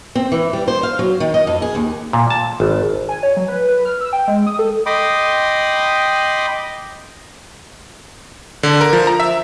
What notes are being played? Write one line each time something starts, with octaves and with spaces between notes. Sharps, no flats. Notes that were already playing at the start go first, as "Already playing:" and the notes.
C4
E3
G3
C5
F5
F#3
D#3
D#5
F2
G#4
D#2
A#2
A5
G#1
G#5
C#5
F#3
B4
B4
F6
E6
G5
G#3
D#6
A4
D#5 G5 B5 C6 D6 D#6
D3
A#4
F3
A#5
E5